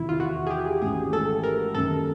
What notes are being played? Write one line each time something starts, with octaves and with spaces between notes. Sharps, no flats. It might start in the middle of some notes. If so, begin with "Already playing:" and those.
Already playing: E2 C3 D#3 E4
F4
F#4
G#4
G4
G#1 G#2 E3 A3 C#4 G#4
A4
A#4
F#2 D#3 G3 A4